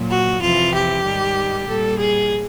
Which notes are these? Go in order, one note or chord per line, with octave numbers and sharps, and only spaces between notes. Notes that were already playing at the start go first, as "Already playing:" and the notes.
Already playing: A#2 F#3
F#4
F2 C3 E3 F4
G4
G#2 D#3 G3
A#2 G3 A4
G#4